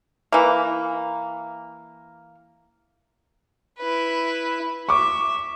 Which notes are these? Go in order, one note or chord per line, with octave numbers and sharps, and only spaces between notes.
E3 A#3
E4 B4
E5 C#6 D6